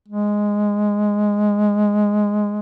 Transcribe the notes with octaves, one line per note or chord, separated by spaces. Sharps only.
G#3